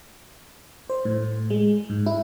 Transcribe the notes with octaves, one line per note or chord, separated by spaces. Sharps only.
C5
A2
G#3
G#2
E4